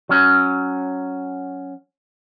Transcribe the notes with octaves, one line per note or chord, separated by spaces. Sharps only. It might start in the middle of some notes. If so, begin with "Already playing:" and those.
F#3 C#4